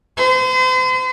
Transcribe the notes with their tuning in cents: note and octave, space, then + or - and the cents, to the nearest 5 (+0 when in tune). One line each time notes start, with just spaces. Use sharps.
C5 -40